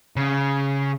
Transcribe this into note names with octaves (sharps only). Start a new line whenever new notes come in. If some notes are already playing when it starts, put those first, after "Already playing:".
C#3